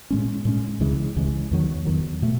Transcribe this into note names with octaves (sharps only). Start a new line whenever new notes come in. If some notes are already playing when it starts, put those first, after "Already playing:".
A2 G#3 C#4
A2 G#3 C#4
C#2 C#3 E3 G#3
C#2 C#3 E3 G#3
E2 D#3 F#3
E2 D#3 F#3
B2 A3